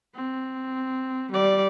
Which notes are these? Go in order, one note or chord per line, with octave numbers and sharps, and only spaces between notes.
C4
G3 D5